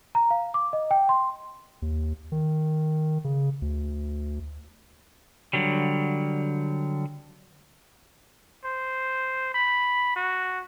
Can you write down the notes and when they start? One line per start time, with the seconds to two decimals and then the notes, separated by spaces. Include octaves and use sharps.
0.15 A#5
0.31 F5
0.54 D6
0.73 D#5
0.91 G5
1.09 C6
1.82 D#2
2.32 D#3
3.24 C#3
3.62 D2
5.53 D3 F#3 G3
8.65 C5
9.54 B5
10.16 F#4